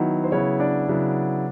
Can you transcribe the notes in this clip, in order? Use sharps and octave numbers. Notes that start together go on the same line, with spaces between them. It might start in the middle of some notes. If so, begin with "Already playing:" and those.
Already playing: D#3 F#3 B3 E4
C5
C#3 F#3 B3 E4 C#5
D4 D5
C#3 F#3 B3 E4